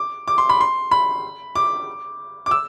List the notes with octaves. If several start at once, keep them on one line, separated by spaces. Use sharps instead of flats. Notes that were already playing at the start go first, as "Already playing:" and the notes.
Already playing: D6
D6
C6
B5
C6
B5
D6
D6
E6